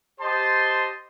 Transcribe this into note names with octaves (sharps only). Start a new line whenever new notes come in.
G4 C5 D#5 A5 C6